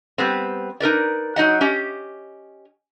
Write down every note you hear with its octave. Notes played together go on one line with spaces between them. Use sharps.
G3 B3 C4
D#4 A#4 B4 D5
F#3 D#4 D#5 F#5
C#4 G4 D#5